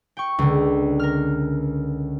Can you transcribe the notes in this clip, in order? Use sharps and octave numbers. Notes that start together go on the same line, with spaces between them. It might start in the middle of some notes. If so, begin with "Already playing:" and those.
G5 C#6
C#2 D3
A#4 F6